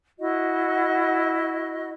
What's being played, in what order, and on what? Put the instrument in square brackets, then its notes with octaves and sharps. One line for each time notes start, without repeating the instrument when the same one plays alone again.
[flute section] E4 F#4 D#5